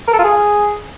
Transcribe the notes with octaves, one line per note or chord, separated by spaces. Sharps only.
A#4
A4
F4
G#4